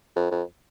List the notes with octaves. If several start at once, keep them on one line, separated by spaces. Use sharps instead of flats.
F2
F2